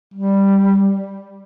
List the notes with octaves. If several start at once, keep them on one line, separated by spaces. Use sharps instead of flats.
G3